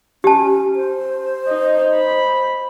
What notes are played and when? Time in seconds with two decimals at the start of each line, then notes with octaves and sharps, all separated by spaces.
0.24 C#4 G4 A5
0.76 C5
1.48 D#4
1.95 B5